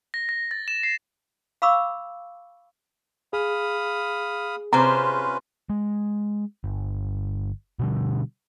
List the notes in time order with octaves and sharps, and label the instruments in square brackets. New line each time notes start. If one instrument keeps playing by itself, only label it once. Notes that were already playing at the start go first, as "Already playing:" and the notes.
[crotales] A#6
A#6
A6
E7
C7
[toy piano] F5 B5 C#6 D6 E6
[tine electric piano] G#4 [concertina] F5 B5 D#6
[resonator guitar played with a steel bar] C3 C5 [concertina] C#4 F4 B4 [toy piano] A#5
[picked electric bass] G#3
G1
B2 D3 G3